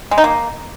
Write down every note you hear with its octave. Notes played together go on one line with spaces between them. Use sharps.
G#3
D#4
A#3